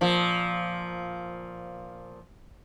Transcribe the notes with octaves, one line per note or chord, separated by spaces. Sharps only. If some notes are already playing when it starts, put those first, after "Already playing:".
A#2 F3